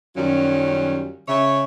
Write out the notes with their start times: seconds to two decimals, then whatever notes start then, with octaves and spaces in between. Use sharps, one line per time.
0.16 F#2 D#3 F#3 G3 C#4 F4
1.28 C#3 C#5 E5